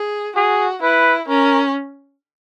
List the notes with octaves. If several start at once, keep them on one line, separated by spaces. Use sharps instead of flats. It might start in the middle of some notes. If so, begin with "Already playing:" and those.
Already playing: G#4
F#4 G#4
E4 B4
C#4 A#4